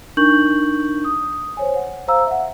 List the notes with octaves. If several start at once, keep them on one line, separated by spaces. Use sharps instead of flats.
D4 D#4 A#4 C#6 G6 F#7
D#6
C5 C#5 G#5
F#5
C5 F5 A#5 E6
E5 F#5